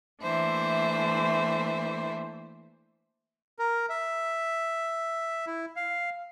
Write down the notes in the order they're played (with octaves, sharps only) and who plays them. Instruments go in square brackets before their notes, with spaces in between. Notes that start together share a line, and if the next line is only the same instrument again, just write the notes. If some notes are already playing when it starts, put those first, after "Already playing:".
[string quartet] E3 A3 A#3 D4 C5 E5
[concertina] A#4
E5
E4
F5